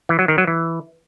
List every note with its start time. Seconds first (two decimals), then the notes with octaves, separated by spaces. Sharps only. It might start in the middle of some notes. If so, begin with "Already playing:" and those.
0.09 E3
0.19 F#3
0.28 D#3
0.38 F#3
0.47 E3